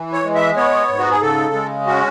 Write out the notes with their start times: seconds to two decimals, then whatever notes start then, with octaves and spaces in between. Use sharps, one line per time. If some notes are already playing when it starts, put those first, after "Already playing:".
Already playing: E3
0.13 C#5
0.24 G#3
0.35 E5
0.56 B3 C#5
0.89 G#2
0.99 F#4
1.10 G#4
1.22 C#3 A4
1.54 G#3
1.86 C#4 F#4